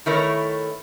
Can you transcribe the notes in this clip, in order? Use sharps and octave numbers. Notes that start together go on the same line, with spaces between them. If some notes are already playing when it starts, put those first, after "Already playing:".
D#3 A3 E4 A#4 B4 C#5